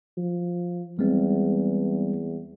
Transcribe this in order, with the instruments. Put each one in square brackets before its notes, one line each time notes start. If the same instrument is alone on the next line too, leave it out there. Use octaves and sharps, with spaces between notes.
[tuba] F3
[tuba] E2 [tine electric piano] G3 G#3 C4